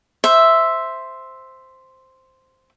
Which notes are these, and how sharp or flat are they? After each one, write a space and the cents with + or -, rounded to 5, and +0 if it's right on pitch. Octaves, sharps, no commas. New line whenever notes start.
C5 +0 E5 +0